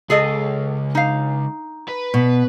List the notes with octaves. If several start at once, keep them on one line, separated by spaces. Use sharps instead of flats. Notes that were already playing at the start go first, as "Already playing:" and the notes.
C#2 G#4 A4 D#5
D#4 F5
B4
B2